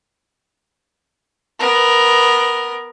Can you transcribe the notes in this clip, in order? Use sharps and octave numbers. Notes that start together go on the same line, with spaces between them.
B3 A#4